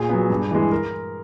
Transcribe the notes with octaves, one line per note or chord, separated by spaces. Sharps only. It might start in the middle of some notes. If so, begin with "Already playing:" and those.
Already playing: A#2 G#4
F#3 B3
G2
E3 G#3
A#4